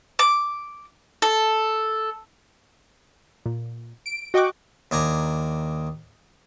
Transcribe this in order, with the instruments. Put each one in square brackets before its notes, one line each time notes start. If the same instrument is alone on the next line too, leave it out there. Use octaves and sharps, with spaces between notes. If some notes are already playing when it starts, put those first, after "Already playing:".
[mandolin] D6
A4
[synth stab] A#2
D7
F#4 D#5 G5 C#6 D6 F#6
[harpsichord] D#2 D4 G#5 A#5